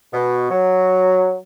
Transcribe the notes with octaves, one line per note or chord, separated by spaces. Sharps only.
B2
F#3